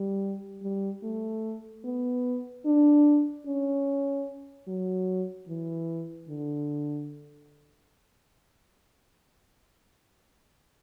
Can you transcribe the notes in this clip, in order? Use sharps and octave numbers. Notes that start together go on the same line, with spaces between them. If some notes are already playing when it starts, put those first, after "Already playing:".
Already playing: G3
G3
A3
B3
D4
C#4
F#3
E3
D3